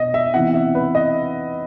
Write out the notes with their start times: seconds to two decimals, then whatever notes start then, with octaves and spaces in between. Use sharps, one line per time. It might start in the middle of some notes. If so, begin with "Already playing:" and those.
Already playing: B2 D#5
0.14 E5
0.34 C3 E3 B3 F#5
0.54 E5
0.75 B4
0.95 D#5